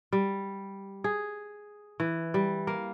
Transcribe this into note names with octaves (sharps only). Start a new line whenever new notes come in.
G3
G#4
E3
G3
A#3